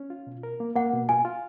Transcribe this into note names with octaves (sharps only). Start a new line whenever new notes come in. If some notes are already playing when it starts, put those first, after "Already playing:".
Already playing: C#4
F4
B2
A#4
A#3
A#3 F#5
B2
F4 G#5
F4